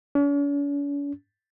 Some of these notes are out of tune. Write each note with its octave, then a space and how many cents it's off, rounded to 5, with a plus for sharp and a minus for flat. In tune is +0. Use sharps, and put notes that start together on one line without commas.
C#4 +45